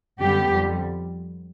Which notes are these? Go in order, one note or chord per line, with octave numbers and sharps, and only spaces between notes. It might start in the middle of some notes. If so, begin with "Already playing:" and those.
F#2 D3 G3 B3 G4
F2 D3 G3